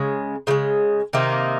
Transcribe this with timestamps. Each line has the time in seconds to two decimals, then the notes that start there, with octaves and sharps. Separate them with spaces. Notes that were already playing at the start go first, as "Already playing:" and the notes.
Already playing: C#3 G#3
0.47 C#3 F3 G#3
1.13 C3 D#3 A#3 D#4